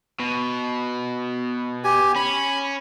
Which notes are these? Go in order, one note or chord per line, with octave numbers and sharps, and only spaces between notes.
B2
G4 G#5
C#4 B5